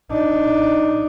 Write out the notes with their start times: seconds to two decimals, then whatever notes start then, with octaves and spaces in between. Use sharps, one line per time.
0.11 D4 D#4